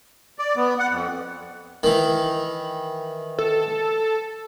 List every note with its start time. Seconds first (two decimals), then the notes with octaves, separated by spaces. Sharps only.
0.39 D5
0.57 B3
0.79 F#5
0.90 F2
1.83 D#3 E3
3.39 A4